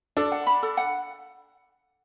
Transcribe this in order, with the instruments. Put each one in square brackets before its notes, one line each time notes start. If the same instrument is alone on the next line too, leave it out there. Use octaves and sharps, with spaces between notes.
[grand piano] D4 [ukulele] A4
[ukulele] F#5
B5
A4
F#5